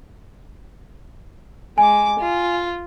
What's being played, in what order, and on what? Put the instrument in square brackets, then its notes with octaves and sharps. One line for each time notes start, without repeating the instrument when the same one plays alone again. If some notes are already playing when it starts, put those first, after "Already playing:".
[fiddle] G#3 D6 [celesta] G#5
[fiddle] F4